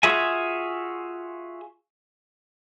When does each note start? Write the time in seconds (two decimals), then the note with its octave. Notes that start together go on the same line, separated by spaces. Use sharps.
0.03 F4 F#4 G#4 E5 G#5